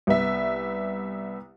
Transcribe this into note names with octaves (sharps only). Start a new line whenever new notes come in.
C2 B3 E5